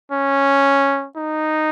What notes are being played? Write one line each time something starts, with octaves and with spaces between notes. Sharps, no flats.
C#4
D#4